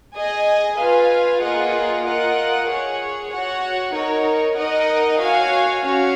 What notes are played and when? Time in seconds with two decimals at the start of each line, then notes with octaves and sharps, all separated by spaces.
0.16 G#4 D#5 G#5
0.79 F4 B4 F5 G#5
1.42 A#3 F4 G#4 D#5 F#5
2.05 F4 A#4 D#5 F#5
2.68 G#4 C#5 F#5
3.31 F#4 C#5 F#5
3.95 D#4 A#4 C#5
4.57 D#4 A#4 D#5 F#5
5.20 F#4 C#5 F5 G#5
5.84 C#4 F#4 C#5 F5